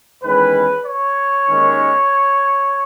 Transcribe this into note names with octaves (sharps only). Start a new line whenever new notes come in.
E2 D#3 G#3 C#4 B4
C#5
D#2 D#3 G#3 C#4